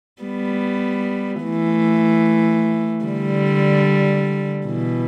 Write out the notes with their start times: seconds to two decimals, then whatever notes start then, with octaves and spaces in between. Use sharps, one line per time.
0.22 G3 B3
1.43 E3 A3
3.05 D3 G3
4.66 B2 E3